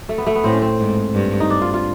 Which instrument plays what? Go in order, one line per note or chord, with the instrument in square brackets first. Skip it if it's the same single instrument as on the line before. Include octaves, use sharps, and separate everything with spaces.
[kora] A3
B3
A3
B3
[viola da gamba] A2 [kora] C4
[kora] C#4
C4
[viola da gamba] G#2
G2
[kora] D#4
D4
F4
F4